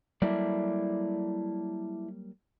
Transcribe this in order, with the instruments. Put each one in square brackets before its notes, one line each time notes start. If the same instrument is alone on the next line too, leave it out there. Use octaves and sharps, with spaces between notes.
[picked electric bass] F#3 G3 A#3 [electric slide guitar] E4 A4 D5